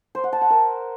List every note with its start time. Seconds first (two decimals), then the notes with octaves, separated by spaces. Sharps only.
0.15 C5
0.24 F#5
0.33 A5
0.41 F#5
0.50 A#4